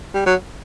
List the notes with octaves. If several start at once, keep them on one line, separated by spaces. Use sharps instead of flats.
G3
F#3